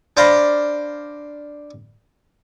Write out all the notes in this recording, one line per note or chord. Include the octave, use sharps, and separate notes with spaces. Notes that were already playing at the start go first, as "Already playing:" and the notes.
D4 C5 D5 F5 A#5 B5